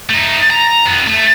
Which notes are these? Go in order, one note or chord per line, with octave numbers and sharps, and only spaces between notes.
A3 D#4
A#5
F2 B3
A3